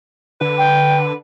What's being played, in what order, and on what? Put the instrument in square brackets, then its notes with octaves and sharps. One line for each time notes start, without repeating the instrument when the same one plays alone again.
[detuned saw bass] D3 [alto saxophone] B4
[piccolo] G5